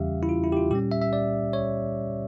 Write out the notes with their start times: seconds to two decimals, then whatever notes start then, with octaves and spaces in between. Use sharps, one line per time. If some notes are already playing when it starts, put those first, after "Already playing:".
Already playing: E2 C#3 E3 G3 C#4 G4 E5 F5
0.23 E4
0.29 F4
0.44 E4
0.52 G4
0.57 F4
0.71 A#2 G3 C#4 G4
0.92 E5
1.02 E5
1.13 D5
1.53 C#5